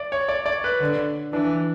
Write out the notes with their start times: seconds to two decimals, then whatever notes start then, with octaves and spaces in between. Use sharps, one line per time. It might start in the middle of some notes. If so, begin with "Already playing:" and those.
Already playing: D5
0.12 C#5
0.29 D5
0.46 D5
0.64 B4
0.80 D3
1.32 E3 D4